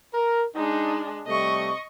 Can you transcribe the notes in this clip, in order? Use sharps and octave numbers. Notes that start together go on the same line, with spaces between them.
A#4
G#3 D4 D#4
C3 G3 A3 D#5 C#6